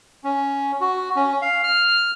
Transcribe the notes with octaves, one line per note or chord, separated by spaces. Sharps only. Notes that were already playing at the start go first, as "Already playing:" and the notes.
C#4
F#4
C#4
F5
F6